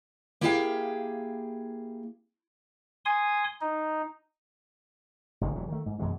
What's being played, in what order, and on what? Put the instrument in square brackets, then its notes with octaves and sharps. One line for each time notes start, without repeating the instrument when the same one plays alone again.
[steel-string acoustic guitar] A#3 E4 G4 G#4 F5 G5
[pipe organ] G#5 C6 D#6
D#4
[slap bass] E1 A1 D3 D#3
E1 D#2 G#2 F#3
D#3 A3
G#2
F#2 B2 E3 G#3